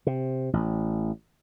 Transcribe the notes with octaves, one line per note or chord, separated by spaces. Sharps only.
C3
A1